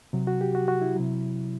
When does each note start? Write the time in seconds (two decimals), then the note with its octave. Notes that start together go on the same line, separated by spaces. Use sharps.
0.13 C3 F#3
0.27 F#4
0.41 G4
0.55 F#4
0.68 F#4
0.82 E4
0.95 C3 F#3